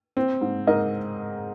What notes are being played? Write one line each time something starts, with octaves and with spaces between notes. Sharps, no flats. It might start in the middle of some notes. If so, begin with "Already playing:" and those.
C4
G#2
G#2 A#4 D#5